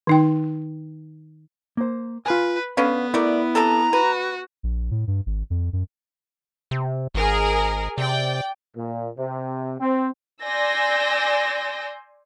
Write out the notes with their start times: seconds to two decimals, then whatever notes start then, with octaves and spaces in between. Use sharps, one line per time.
0.07 D#3 D#4 G5
1.77 A#3 C5
2.26 F4 B4 G#5
2.77 D3 B3 C#4 B4 F5
3.14 A3 E4 A#4 D5
3.55 C3 A4 A#5
3.93 F#4 B4
4.63 A#1
4.91 A2
5.07 G2
5.26 G#1
5.50 F2
5.73 F#2
6.71 C3
7.15 G#1 G#4 A#4
7.98 C3 D5 G5
8.76 A#2
9.18 C3
9.80 C4
10.43 D5 G#5 C6 E6 G6 A#6